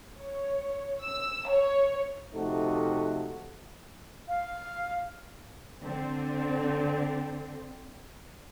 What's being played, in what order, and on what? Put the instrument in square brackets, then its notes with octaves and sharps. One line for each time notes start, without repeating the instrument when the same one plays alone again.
[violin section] C#5
E6
C#5
[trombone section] C3 F3 A3 D#4 F#4 A4
[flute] F5
[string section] D3 C4